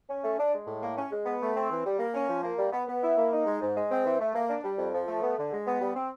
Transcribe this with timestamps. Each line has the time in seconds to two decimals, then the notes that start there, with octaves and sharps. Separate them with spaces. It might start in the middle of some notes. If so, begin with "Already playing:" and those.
0.09 C#4
0.24 A3
0.39 D4
0.54 G#3
0.67 A2
0.82 A#3
0.97 C#4
1.12 G#3
1.26 B3
1.41 A3
1.56 C4
1.70 E3
1.85 G3
1.99 A#3
2.14 C#4
2.29 F3
2.43 A#3
2.58 G3
2.72 B3
2.87 B3
3.03 E4
3.17 A#3
3.32 D#4
3.46 G#3
3.62 G#2
3.76 G#3
3.91 C4
4.05 E3
4.20 A3
4.35 A#3
4.49 D4
4.64 G3
4.78 F2
4.93 F3
5.08 A3
5.22 B3
5.38 D3
5.52 G#3
5.67 B3
5.81 G3
5.95 C4